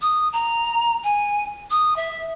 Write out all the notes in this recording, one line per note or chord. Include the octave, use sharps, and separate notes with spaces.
D#6
A#5
G#5
D#6
E5